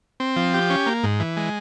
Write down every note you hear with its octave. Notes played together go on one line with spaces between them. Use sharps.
C4
F3
G4
C#4
A#3
G#2
E3
G#3